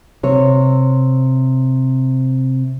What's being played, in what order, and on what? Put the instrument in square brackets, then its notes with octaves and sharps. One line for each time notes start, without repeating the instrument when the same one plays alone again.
[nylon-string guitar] C3 C#5